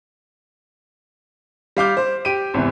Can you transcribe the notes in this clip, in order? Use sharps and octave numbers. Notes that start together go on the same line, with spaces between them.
G3 F5 D6 G6
C5
G4 D7 D#7
G#1 E2 C3 E3